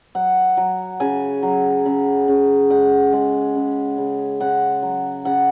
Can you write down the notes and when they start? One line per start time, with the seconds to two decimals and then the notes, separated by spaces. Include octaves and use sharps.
0.15 F#3 F#5
0.57 F#3
1.00 C#3 G#5
1.43 F#3
1.85 C#3
2.28 C#3
2.70 G#3 F#5
3.13 G#3
3.55 C#3
3.98 C#3
4.40 C#3 F#5
4.82 F#3
5.25 C#3 F#5